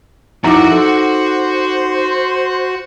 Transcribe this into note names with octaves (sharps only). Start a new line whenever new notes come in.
F2 D#4 E4 F#4 A#4 F#5 A#5 D6
A4 C5